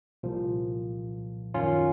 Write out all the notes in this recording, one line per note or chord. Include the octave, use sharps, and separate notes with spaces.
C2 A#2 F3
F#2 D#3 C#4 F4